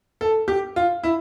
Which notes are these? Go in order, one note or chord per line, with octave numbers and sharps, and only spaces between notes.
A4
G4
F4
E4